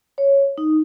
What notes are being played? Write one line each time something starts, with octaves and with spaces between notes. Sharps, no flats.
C#5
D#4